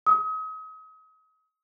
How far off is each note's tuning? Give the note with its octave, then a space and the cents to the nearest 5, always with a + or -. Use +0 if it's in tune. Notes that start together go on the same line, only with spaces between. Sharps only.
D#6 +35